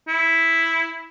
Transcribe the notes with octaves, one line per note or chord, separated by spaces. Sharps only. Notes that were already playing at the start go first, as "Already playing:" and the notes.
E4